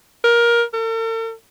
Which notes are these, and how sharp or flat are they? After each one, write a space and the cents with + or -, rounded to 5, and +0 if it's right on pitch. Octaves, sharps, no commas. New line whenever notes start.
A#4 +15
A4 +45